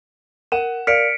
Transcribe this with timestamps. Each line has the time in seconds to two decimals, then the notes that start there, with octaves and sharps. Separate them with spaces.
0.52 A#4 F#5 D#7 E7
0.87 A#4 D5 F5 F6 B6 C#7 D7